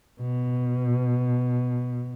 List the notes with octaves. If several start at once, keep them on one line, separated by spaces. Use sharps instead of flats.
B2